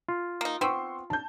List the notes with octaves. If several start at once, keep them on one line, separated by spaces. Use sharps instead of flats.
F4
A#3 D#4
B3 C4 C6 C#6 E6
A5 G6